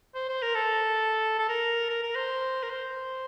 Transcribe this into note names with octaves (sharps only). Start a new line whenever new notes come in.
C5
C5
A#4
A4
A4
A#4
A#4
A#4
C5
A#4
C5